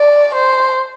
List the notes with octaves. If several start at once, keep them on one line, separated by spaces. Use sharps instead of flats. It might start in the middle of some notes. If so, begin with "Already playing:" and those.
Already playing: D5
C5